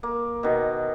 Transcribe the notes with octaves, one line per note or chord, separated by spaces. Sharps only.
A#3
B2 D#3